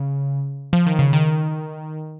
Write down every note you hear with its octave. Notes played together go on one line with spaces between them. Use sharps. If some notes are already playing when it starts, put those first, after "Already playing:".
Already playing: C#3
F3
D#3
C#3
D#3